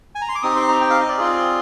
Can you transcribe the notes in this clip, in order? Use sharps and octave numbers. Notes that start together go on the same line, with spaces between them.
G#5
A#5
C6
D6
C4 D#4 G4 D#6
C6
A#5
G5
F5
D#5
D5
C4 F4 G#4